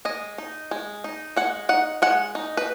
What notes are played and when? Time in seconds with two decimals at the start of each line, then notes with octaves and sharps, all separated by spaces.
0.05 G#3 D#5
0.38 D#4
0.71 G#3
1.04 D#4
1.36 G#3 F#5
1.69 D#4 F#5
2.02 G#3 F#5
2.35 D#4
2.57 B4